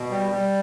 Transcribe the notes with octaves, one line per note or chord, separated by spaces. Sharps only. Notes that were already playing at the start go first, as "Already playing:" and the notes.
Already playing: B2
G3
G3